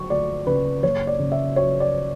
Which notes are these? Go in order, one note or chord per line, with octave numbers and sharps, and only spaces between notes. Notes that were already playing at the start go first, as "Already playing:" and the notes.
Already playing: D2 F#3 C#6
D2 D5
C#3 B4
F#1 C#5
D5
C#3
E5
F#3 C#5
D5